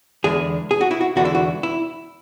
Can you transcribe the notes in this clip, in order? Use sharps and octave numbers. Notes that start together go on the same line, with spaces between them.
E2 D3 G#3 G#4
G#4
F#4
E4
F#4
E2 D3 G#3 F#4
E4
F#4
E4